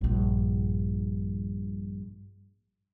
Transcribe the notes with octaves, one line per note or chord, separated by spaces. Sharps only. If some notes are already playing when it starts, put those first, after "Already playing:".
A#1 G2